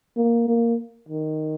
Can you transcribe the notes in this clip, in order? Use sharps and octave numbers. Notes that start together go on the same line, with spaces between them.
A#3
A#3
D#3